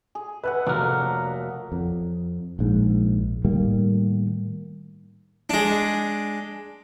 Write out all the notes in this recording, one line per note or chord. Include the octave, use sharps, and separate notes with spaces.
G#4
B4 E5 F#5 F#6
F1 F#3 A#3 D4 A#4
F2
A#1 G#2
A2 D#3 G3 A#3
G#3 D4